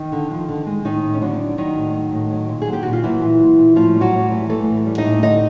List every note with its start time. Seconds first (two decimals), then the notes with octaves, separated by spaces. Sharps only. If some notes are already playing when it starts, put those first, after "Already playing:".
Already playing: D#3 D#4
0.12 D3
0.31 F3
0.49 D3
0.66 G#3
0.85 A2 D#3 D#4
1.03 A2
1.14 C#4
1.21 D3 F#3 D4
1.39 F#3
1.58 D#3 F#3 D#4
1.77 A2
1.94 F#3
2.12 A2
2.30 F#3
2.49 A#2
2.62 G#4
2.67 F#3
2.73 G4
2.83 A#2 F#4
2.93 F4
3.04 E3 F#3 E4
3.22 A#2
3.40 F#3
3.58 A#2
3.76 A2 F3 F4
3.95 G3
4.01 F#3 F#4
4.13 A2
4.31 E3
4.49 E3 A3 A4
4.68 A2
4.86 G3
4.98 D#4 D#5
5.04 A2
5.22 D3 D#4 D#5